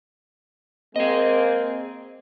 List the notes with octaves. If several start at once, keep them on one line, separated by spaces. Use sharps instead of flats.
G#3 A#3 C4 G#4 D#5